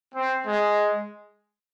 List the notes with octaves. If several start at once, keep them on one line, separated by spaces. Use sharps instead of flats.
C4
G#3